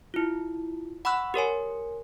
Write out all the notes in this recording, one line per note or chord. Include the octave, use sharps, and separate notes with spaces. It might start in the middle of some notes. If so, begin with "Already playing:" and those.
E4 F4
F#5 B5 C#6 E6 F#6
G4 A#4 C#5 G#5